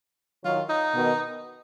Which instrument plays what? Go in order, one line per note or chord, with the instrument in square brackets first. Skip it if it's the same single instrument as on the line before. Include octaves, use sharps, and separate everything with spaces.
[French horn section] D#3 F#3 [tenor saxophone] F4
[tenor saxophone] D#4
[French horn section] B2 D#3